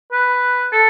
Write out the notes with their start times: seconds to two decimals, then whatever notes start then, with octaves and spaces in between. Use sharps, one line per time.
0.12 B4
0.73 A4